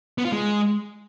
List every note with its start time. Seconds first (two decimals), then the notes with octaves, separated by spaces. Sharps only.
0.18 B3
0.25 F4
0.32 G#3